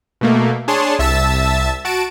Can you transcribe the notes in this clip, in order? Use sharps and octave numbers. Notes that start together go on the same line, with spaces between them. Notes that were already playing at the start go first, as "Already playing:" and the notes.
B2 A3 A#3
D4 G#4 C#5 A5 C6
C2 E5 A5 E6 A6 E7
F#4 A5 D7 E7